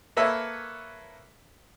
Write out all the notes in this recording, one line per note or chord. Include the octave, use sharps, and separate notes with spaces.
A#3 A4 B4 C#5 E5